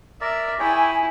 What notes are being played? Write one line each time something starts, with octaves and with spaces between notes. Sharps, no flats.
A#4 D5 E5
E4 G#4 C#5 G5 G#5